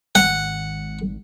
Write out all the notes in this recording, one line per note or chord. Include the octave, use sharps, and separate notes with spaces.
G#1 F#5